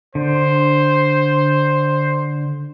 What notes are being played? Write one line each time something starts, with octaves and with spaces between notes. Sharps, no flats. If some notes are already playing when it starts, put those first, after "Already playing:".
D3 C5